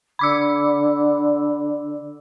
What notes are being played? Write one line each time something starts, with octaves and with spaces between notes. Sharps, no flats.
D3 B5 D6 E6